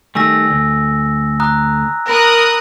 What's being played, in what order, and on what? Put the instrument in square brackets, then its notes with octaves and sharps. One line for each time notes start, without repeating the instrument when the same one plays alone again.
[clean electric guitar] D#3 G3 A3 [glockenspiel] G#5 E6 A#6
[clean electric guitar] D2
[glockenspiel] A#5 D#6 F#6
[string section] A#4 D#6 F#6 [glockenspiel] A#5 B5 A#6